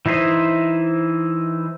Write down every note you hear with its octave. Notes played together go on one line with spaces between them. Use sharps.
E3 D#4 E4 C5 D#5